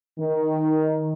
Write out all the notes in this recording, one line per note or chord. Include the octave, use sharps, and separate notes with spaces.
D#3